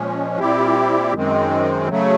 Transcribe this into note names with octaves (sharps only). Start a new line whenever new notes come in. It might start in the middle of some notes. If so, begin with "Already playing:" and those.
Already playing: A#2 F3 G#3 C#4
A#2 G3 C4 E4 G4
F#2 D#3 G#3 C4
C#3 F#3 A3